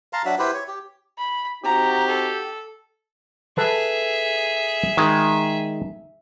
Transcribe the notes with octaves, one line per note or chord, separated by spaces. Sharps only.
F5 A5 A#5 C6
F#3 D4 F#4 E5
E4 G4 B4 C5
C#5
G4
B5
C4 D#4 F#4 G4 A#5
A4
G#4 A4 B4 E5 A5
D#3 G#3